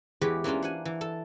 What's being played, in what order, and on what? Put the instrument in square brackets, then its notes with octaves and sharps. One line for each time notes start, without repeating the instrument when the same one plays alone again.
[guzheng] E2 E3 G#3 G4 B4 C#5
E3 A#3 C#4 D4 F4
C5 F#5 G#5
E3
A4 A5